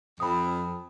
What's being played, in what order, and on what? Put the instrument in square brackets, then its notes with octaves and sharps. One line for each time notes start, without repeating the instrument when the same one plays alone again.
[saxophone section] F2 [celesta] B5 D#6